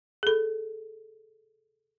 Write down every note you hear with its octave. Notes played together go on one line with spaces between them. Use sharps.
G#4 A4